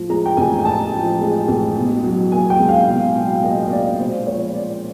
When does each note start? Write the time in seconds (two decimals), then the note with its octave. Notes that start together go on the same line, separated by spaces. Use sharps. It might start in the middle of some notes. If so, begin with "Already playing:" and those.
Already playing: A2 F3
0.09 G#3 A#5
0.26 G5
0.37 A1 G#5
0.59 G#5
0.65 A2 A5
0.93 F3
1.21 G#3
1.48 A1
1.77 B2
2.04 F#3
2.32 A#3 G#5
2.50 G5
2.60 C#2
2.69 F5
2.87 B2
3.15 F#3
3.43 A#3 D#5
3.65 D#5
3.71 C#2 D5
3.99 A#2 C5
4.27 F3 C#5
4.54 A#3 D5